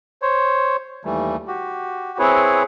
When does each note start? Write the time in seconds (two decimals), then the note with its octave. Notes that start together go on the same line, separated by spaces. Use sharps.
0.22 C5 C#5
1.05 D#2 E3 G3 A3
1.48 F#4 G4
2.19 C4 E4 G#4 B4 C#5